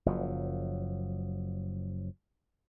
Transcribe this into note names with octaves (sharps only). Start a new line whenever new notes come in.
F#1 F3 F#3